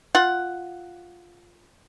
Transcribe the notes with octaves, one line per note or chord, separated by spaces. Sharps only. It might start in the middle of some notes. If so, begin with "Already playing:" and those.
F4 F#5